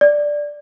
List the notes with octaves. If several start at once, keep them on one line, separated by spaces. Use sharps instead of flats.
D5